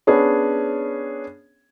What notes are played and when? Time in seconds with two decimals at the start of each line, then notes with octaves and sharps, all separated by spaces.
0.07 B3 C#4 D4 G#4 C#5